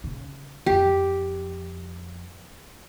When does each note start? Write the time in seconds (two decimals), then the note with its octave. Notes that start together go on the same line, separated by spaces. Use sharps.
0.04 C#3 D#4
0.66 F2 F3 G4